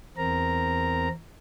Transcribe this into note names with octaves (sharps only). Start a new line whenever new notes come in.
E2 C4 A#4 A#5